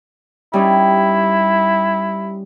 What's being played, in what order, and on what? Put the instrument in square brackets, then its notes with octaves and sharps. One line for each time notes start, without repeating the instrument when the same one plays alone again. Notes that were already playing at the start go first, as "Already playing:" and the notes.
[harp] G3 C#4 D#4 [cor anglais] E4